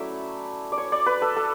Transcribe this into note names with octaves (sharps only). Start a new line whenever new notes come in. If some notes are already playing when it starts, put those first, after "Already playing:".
Already playing: F#3 A3 C#4 E4 D5 E5
D5
C#5
D5
B4
A4
A4